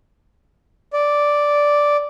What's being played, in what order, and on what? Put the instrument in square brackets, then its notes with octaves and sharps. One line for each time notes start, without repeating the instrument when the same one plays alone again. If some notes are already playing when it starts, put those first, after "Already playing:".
[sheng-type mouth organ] D5